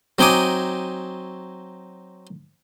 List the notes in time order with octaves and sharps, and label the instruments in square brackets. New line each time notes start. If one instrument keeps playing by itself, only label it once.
[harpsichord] F#3 C4 D#4 G#5 D6 D#6